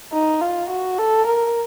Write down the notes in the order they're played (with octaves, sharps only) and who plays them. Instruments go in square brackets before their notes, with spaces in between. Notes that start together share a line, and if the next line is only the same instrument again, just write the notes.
[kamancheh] D#4
F4
F#4
A4
A#4